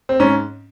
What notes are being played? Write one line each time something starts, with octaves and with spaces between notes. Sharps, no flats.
C4
G#2 C#4